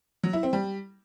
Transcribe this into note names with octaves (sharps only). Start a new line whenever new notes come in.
F#3
E4
C4
G3